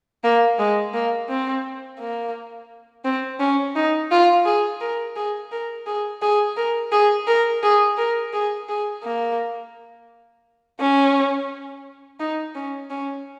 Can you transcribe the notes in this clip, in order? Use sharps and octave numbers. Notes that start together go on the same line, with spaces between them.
A#3
G#3
A#3
C4
A#3
C4
C#4
D#4
F4
G#4
A#4
G#4
A#4
G#4
G#4
A#4
G#4
A#4
G#4
A#4
G#4
G#4
A#3
C#4
D#4
C#4
C#4